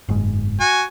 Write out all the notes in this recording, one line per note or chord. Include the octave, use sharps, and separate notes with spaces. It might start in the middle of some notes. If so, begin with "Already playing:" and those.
F#1 G#2
F#4 G#5